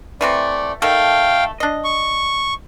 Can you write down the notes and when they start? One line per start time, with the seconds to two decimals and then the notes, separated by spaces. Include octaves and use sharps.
0.21 E3 A3 C4 D5
0.82 D#3 A3 A4 F5 G5
1.60 D4 D#5
1.84 C#6